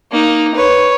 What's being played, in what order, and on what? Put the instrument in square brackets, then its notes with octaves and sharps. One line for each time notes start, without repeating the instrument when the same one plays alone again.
[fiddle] A#3 D#4
B4 C#5